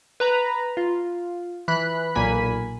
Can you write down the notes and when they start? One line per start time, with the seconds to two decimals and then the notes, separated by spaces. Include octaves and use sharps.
0.20 B4 A#5 B5
0.77 F4
1.68 E3 B5 F#6
2.15 B1 A#2 A#3 G#5 B5 B6